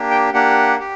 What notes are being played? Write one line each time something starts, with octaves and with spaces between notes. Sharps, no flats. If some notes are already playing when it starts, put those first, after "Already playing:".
Already playing: A#3 D4 G4
G5
A#3 D4 G4 F#5
G4